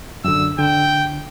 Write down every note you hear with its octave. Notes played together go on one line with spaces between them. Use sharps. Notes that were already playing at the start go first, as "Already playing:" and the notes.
F#2 D3 E6
D3 G5